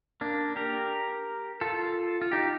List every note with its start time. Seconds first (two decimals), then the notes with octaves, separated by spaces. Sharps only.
0.21 A#3 D4
0.56 G4 A#4
1.61 F4 A4
2.21 F4
2.32 D#4 G4